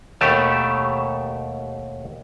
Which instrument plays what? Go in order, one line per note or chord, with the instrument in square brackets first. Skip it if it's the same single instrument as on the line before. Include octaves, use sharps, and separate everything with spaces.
[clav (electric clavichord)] D#2 B2 A3 G4 A5